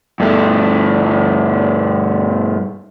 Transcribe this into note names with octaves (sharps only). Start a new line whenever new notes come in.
G2 A3